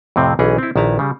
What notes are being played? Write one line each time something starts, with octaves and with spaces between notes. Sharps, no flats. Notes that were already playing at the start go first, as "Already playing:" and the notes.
F2 A2 C3 C4
B1 E3 C#4 G#4 D5 D#5
C4 E4
A#1 D#3 E4 B4 A5 A#5
C#3 G3